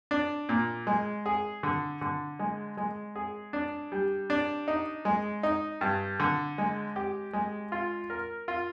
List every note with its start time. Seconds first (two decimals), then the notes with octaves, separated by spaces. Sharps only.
0.11 D4
0.49 A#2
0.87 G#3
1.26 G#4
1.63 D3
2.01 D3
2.39 G#3
2.77 G#3
3.16 G#4
3.53 D4
3.92 G3
4.30 D4
4.68 D#4
5.05 G#3
5.43 D#4
5.81 G2
6.20 D3
6.58 G#3
6.96 G4
7.33 G#3
7.72 F4
8.10 A#4
8.48 F4